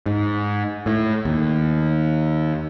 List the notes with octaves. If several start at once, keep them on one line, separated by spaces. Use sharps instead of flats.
G#2
A2
D#2